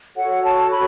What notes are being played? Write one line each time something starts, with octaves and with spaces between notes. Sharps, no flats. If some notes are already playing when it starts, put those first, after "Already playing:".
F#4 A4 C#5 F#5
A5
B5